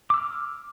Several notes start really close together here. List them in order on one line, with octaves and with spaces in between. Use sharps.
D6 E6 F6